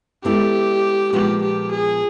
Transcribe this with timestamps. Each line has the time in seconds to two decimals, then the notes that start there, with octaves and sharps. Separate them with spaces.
0.24 G#3 B3 E4 G4 A4 D5
1.12 A#2 F3 G#3 B3 G4
1.43 G4
1.71 G#4